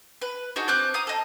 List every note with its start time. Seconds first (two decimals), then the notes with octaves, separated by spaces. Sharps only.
0.22 B4
0.56 D4 D#4 F#4 G#4
0.68 C4 D6 F#6 G6
0.94 F5 A#5 D#6
1.07 A4 D#5